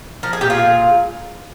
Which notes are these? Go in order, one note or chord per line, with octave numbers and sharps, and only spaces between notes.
F3 A#4
G#4
A#2 G4
F4 G#4
D3